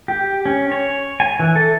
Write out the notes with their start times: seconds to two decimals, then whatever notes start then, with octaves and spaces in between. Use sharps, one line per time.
0.08 G4
0.45 C#4
0.72 C#5
1.20 G#5
1.39 E3
1.55 A4